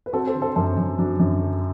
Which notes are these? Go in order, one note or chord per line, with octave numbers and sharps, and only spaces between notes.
B4
C4 F#4 A4
A4 C5
D3
A4 C5
F#2 A4 C5
F#2
F#3 D4
F#2
D3